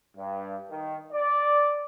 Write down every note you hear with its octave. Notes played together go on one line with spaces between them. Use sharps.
G2
D#3
D5